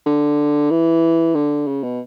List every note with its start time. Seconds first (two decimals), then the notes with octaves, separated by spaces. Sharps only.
0.06 D3
0.71 E3
1.35 D3
1.68 C#3
1.83 B2